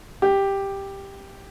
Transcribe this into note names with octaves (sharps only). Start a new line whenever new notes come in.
G4